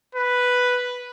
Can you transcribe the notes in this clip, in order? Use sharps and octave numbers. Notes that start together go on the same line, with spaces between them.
B4